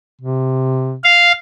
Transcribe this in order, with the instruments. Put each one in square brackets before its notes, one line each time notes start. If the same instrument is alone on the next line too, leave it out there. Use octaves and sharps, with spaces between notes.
[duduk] C3
[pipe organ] F5